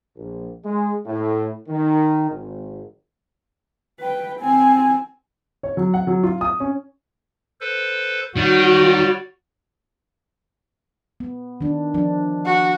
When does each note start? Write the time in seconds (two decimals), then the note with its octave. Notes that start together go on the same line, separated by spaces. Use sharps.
0.16 A#1
0.65 G#3
1.06 A2
1.68 D#3
2.30 G#1
4.00 B4 G5
4.40 C4 G#5
5.63 C#5
5.77 F#3
5.94 F#5
6.07 F#3
6.23 F4
6.41 D#6
6.60 C#4
7.61 A4 B4 C5
8.37 D#3 G3 F#4 C#5 D5
11.20 B3
11.61 D#3 D4
11.94 F3 D4
12.46 F#4